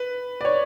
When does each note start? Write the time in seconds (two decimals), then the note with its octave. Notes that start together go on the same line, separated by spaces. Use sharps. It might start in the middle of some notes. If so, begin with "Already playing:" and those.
Already playing: B4
0.41 D5
0.45 C#5